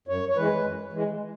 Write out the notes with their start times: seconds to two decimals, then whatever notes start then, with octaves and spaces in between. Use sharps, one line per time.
0.08 F#2 C#5
0.29 C#5
0.36 E3 G#3 B4
0.64 F#2
0.93 E3 G#3